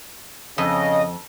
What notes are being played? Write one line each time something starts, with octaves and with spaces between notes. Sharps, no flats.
F2 C#3 D#5